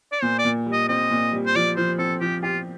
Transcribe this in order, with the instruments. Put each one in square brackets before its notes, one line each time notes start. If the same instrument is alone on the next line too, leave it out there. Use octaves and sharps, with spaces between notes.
[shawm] D5
[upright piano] A#2 [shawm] C5
[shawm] D5
[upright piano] A#2
G3
[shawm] D#5
[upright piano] C4 [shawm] D#5
[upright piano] A#2
G3
[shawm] C5
[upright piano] F3 [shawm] D5
[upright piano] F3 [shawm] C5
[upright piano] C4 [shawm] A4
[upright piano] F3 [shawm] G4
[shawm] F4 [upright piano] G4